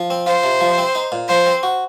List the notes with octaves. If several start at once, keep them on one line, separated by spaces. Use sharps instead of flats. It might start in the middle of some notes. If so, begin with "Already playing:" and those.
Already playing: F3
C4
F4 C5
C3
F3
C4
D#4
A#2
F3 C5
C4
F#4